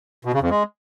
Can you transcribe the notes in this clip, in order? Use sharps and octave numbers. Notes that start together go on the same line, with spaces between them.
B2
C#3
F2
G#3